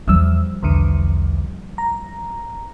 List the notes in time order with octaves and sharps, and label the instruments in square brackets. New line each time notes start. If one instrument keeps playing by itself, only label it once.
[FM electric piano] E2 E6 [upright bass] F3 G3
[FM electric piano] B1 E2 D3
A#5